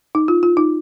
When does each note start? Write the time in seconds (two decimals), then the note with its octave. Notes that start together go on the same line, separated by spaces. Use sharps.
0.15 D#4
0.28 F4
0.43 F4
0.57 D#4